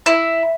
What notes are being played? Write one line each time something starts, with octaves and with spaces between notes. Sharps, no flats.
E4